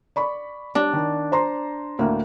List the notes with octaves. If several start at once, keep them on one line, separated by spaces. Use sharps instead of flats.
D5 B5 C#6
G3 D4
D#3
C5 A#5 C6
D2 A2 A#3